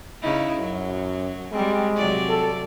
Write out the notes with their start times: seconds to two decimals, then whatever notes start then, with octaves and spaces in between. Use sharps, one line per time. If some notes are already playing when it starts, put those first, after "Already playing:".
0.22 C#3 D#4 E4
0.59 F#2 F#3
1.52 G3 G#3 C4
1.96 C3 F#3 D5
2.29 A4